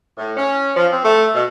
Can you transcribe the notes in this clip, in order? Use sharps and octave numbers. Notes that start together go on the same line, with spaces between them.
A2
C#4
F3
C4
A3
B2